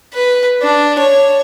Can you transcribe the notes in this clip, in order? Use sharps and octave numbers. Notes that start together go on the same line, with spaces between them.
B4
D4
C#5